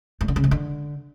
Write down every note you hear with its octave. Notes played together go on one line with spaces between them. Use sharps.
G2
D3
C#3
G#2
D3